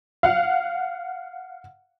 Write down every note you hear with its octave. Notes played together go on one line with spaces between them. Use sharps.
F5 F#5